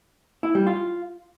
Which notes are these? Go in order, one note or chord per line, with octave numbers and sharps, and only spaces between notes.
E4
G3
F4